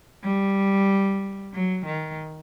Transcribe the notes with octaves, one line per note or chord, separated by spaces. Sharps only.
G3
F#3
D#3